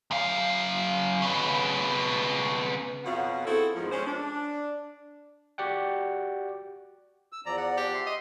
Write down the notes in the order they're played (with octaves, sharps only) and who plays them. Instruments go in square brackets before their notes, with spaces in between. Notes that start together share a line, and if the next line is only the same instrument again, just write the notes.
[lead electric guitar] F#2 F5
C#3 B3
[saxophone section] F2 B2 C#4 F#4 F5 F#5
C4 E4 F#4 G#4 A4
E2 G#2 D#3 F3
G#3 C#4 C5
D4
[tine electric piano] F#4 G4 D5 F#5 G5
[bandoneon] E6
[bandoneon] E2 F3 D5 [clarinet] A#5
[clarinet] F#5
[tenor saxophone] G4
[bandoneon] E5 [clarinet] C6
[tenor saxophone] D#5